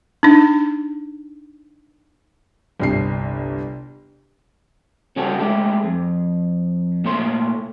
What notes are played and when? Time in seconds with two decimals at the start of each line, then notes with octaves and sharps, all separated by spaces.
0.23 D4 D#4
2.80 G1 C2 C7
5.16 C#3 G3 C#4 F#4 G4 A4
5.39 G#3 A3 G4
5.84 F2
7.04 A#2 A3 C#5 C6